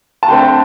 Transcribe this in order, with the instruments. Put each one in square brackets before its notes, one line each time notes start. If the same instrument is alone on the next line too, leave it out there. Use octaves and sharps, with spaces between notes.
[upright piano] A5
[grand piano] D3 A3 C4 [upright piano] G5